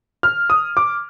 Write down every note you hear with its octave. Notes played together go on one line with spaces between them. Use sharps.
F6
D#6
D6